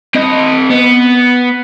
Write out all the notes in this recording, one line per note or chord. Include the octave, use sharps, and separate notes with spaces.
C4 D#5
B3